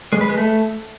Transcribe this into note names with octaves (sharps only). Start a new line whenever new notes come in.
G#3
B4
G#3
A3